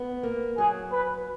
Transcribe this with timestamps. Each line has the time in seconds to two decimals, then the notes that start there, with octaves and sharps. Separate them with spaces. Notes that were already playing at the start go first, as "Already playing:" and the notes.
Already playing: B3
0.23 A#3
0.57 F#3 G#4
0.92 B4